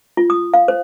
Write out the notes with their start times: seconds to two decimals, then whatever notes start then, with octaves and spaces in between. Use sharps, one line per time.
0.17 F4
0.30 D#6
0.54 F5
0.68 C5